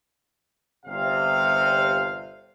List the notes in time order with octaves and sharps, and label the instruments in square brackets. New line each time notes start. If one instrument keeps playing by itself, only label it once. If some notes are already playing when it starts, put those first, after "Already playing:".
[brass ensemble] G1 C3 F5